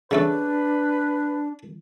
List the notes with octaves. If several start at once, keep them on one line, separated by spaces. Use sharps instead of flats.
C#3 A3 D4 A4 B4